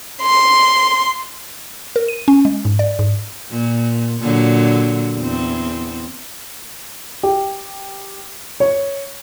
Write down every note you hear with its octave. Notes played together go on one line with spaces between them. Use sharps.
C6
A#4
D#7
C#4
G#3
G#2
D5
G#2
A#2
A#2 D3 F#3
E2 C4
G4
C#5